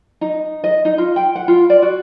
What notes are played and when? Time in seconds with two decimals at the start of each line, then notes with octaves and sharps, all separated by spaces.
0.21 D#4
0.64 D#5
0.85 D#4
0.98 F4
1.16 G5
1.35 F#5
1.48 F4
1.70 D5
1.82 F#4